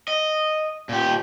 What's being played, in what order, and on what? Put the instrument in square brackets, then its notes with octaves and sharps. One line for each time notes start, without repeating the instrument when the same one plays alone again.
[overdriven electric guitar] D#5
A#2 G4